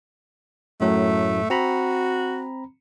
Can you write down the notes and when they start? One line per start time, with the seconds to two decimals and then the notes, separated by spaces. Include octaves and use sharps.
0.81 F#2 A2 F#3 A3
1.50 C4 F#4 A#5 B5